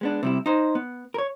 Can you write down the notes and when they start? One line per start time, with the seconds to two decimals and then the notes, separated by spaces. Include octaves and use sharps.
0.01 G#3 B3 D4
0.23 C3 G3 E4
0.46 D#4 C5
0.75 B3
1.14 A#4 C#5